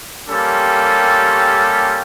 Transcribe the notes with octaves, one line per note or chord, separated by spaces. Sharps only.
G3 A#3 C#4 G4 A4 C6